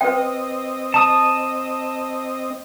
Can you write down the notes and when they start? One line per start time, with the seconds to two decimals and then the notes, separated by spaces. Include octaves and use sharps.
0.01 C4 B4 D#5 G5
0.94 A5 D#6